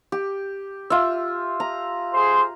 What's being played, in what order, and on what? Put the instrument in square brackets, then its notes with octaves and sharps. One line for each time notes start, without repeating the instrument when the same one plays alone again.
[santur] G4
F4 E5
A#5
[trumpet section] G#4 C5 C6